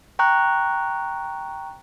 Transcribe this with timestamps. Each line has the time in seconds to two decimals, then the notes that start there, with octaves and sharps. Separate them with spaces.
0.19 G5 A#5 C#6 F#6